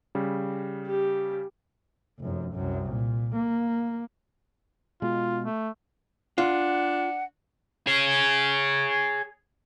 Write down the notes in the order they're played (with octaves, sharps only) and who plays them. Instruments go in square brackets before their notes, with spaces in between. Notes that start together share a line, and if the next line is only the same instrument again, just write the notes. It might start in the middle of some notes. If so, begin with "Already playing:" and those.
[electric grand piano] C#3 G3
[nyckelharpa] G4
[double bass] F1 F#2
C2 F#2
A#2
A#3
[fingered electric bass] B2 G#3 [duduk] F4
[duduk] A3
[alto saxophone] D4 [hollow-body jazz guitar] F4 [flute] F#5
[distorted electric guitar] G#4 C#5